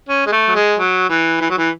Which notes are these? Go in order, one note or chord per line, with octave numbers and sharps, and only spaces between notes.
C#4
G#3
A3
F#3
G#3
F#3
E3
E3
F#3
E3